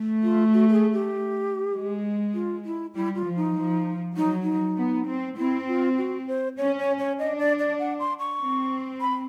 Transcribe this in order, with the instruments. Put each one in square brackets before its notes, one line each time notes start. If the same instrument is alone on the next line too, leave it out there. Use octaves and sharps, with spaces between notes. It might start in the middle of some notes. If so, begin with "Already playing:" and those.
Already playing: [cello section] A3
[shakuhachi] F4
F#4
A4
G#4
G4
[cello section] G#3
[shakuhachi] F4
E4
[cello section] G3 [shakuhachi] E4
[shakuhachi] F4
[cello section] F3
[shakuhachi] D#4
[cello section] F3
[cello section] F#3 [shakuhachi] D#4
[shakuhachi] D#4
[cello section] B3
C4
[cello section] C4 [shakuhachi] E4
[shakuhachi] F4
F#4
C5
[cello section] C#4 [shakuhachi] C#5
[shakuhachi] C#5
C#5
[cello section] D4 [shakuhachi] D#5
[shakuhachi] D5
D5
F#5
C6
C#6
[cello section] C4
[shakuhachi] B5